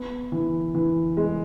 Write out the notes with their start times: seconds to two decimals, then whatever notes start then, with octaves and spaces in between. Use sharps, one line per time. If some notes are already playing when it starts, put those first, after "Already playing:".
Already playing: B3
0.32 E3
0.74 E3
1.17 G#3